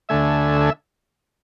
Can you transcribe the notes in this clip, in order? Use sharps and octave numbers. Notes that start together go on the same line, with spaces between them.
D2 D3 A3 E5 G#5
G#5